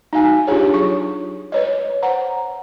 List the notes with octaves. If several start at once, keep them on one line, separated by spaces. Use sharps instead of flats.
D#4 F#4 F5 G#5
D4 F4 G4 G#4 C#5
F#3 C#6
B4 C#5 D#5
C5 F#5 A#5